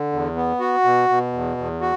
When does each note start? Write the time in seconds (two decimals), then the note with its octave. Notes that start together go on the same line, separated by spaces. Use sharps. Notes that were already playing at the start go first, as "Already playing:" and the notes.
Already playing: D3
0.12 E2
0.36 B3
0.60 F#4
0.84 B2
1.09 B2
1.33 E2
1.57 E2
1.81 F#4